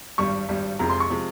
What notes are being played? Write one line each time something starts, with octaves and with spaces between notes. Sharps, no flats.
G#1 G2 G3 C#6
G#1 G2 G3
F1 F2 C3 F3 G#3 A#5
C6
C#6
C3 F3 G#3